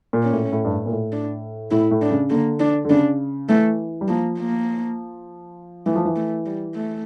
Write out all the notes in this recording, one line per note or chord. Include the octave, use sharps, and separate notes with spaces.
A#2
C#4
A2
A2
G2
A2
A#2
A2
D4
A2 E4
A2
D4
C#3
D3 A#3
D4
D3
C#3 D4
E3 A3
G3
F3 A#3
A#3
E3 A3
F3
E3
A3
G3
A3